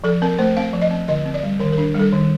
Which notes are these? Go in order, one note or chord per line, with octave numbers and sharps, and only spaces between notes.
F3 A4
C4 A#4
A3 C5
C4 F5
F3
D#5
C4
D3 D#5
C4
D5
G3
D#3 A#4
A#4
D4
G3 A4
D#3